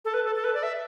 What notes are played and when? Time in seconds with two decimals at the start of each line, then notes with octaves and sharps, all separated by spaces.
0.05 A4
0.14 B4
0.24 A4
0.35 A4
0.44 B4
0.54 D5
0.63 E5